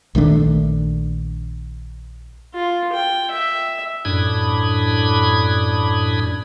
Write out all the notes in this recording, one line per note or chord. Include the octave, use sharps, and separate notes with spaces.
A#1 D#3 A3 D4
F4
G5
E5
F#2 A2 D4 B5 D#6 G#6